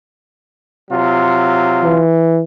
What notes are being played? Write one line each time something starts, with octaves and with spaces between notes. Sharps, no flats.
C3 F#3 F4
E3